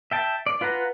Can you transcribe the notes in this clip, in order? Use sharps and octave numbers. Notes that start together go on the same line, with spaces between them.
E5 G5 A5
D5
F4 B4 F#5 A#5